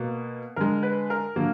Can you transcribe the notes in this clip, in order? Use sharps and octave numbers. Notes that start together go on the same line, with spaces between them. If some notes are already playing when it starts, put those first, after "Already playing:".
Already playing: B2 A#3
D3 G#3 A#4
B4
A#4
D3 F#3 A#3